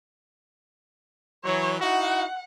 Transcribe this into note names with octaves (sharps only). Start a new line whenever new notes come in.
E3 F#3 C#5
D#4 E4 F#4 F#5